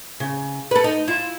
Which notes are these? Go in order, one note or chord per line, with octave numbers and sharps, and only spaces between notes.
C#3
A4 B4
D#4
E4 F4